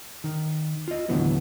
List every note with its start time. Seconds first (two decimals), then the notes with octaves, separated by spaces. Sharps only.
0.24 D#3
0.88 F4 D#5
1.09 D#2 A2 D3 E3 F#3 B3